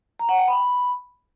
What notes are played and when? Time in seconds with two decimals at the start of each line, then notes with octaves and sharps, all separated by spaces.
0.19 A#5
0.29 F#5
0.38 G5
0.48 B5